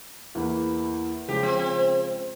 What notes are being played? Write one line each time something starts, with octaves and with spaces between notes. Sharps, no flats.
E2 E3 A#3 E4
C#3 F3 G#3 G4
C4
C4